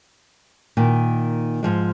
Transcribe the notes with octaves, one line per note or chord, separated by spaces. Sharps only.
A#2 D#3
G#2 F3 G#3